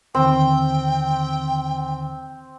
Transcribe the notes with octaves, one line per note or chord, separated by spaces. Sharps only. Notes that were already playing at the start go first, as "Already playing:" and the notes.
D#2 D3 D#3 C4 G5